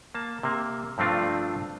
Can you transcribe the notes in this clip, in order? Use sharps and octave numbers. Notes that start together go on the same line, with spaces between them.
A#3 A5
C3 A#3
G2 F3 A3 C4 D4 F4